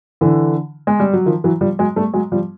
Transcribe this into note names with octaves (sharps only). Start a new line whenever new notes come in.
D3 E3
G#3
G3
F#3
D#3 F3
E3 F#3
F3 G3
F#3 G#3
G3 A3
F#3 G#3
F3 G3